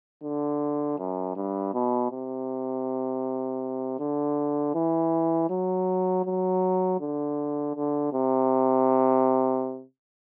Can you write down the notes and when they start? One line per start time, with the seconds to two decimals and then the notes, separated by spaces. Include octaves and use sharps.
0.23 D3
0.98 F#2
1.36 G2
1.74 B2
2.11 C3
3.99 D3
4.75 E3
5.50 F#3
6.25 F#3
7.00 D3
7.75 D3
8.13 C3